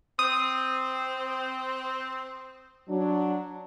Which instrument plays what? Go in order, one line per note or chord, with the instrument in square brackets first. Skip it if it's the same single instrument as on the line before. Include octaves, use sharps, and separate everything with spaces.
[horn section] C4 [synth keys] D#6
[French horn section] F#3 D4